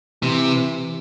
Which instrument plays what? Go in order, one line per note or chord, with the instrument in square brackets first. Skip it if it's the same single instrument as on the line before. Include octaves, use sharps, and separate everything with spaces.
[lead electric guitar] C3 [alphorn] E3